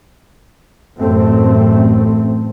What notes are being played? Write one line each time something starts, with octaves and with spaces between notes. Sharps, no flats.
A1 F#2 A3 C4